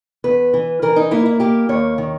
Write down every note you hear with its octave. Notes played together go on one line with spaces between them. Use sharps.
E2 B4
E3
E3 A#4
D#4
A#3 E4
E4
A#3 G4
D#2 C#5
D#3